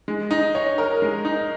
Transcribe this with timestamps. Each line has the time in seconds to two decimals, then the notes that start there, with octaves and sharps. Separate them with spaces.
0.08 G#3
0.31 D#4
0.55 C#5
0.78 A#4
1.02 G#3
1.25 D#4